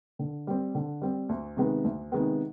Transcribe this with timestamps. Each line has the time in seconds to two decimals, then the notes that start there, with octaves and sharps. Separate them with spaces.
0.19 D3
0.47 G3 C4
0.75 D3
1.02 G3 C4
1.29 D2
1.57 C3 D#3 G#3 B3
1.84 D2
2.12 C3 D#3 G#3 B3